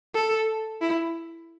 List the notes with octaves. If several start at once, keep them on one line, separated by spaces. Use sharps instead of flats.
A4
E4